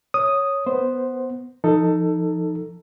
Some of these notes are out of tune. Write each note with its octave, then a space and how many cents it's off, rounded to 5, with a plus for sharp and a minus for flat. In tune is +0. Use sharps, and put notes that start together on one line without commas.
C#5 +0 D#6 +0
B3 +5 C5 +0
F3 -30 D#4 +0 A4 +15